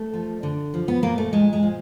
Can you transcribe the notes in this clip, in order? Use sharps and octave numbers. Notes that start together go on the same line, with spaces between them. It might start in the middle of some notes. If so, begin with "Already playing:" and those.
Already playing: A3
F3
D3
F3
B3
A#2 A#3
A3
A#2 G#3
G#3
F3